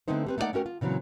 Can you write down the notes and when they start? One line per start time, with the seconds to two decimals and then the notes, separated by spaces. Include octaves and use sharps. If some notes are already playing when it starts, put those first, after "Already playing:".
0.08 D3 A3 B3 C4 D#4 C5
0.26 G3 C4 B4
0.38 A3 A#3 D#4 F#4 D5 F#5
0.53 A3 C#4 F#4 A#4 G5
0.66 F4
0.81 A#2 C#3 E3 F#3 C4